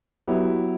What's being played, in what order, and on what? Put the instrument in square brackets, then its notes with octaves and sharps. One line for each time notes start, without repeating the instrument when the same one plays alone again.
[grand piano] F#3 B3 E4 G4